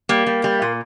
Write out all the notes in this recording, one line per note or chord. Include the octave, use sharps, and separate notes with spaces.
G3 A#3
G3
G3
A#2